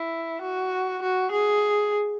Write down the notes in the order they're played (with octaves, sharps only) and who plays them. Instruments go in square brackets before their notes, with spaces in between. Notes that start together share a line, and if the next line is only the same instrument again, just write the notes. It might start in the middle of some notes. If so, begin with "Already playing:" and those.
Already playing: [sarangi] E4
F#4
F#4
G#4